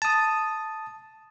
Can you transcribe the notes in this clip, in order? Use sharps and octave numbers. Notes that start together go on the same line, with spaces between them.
A5 D#6